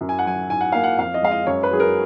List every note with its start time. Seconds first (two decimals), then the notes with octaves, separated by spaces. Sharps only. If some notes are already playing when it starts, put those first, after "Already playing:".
0.01 F#2
0.09 G#5
0.19 F#5
0.25 F#3 G#5
0.49 G#2 G#5
0.61 F#5
0.72 A#3 F5
0.84 F#5
0.98 F2 F5
1.14 D#5
1.22 G#3 F5
1.31 D#5
1.47 F#2 C#5
1.63 B4
1.71 F#3 G#4
1.80 A#4